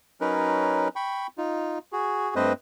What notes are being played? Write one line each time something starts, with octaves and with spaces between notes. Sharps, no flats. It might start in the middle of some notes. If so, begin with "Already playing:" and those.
F#3 C#4 D#4 A#4 B4
G5 B5 C#6
D#4 F4
F#4 G#4
G2 A3 C4 B4 C5 D#5